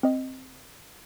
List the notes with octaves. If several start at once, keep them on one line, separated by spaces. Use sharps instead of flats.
C4 D#5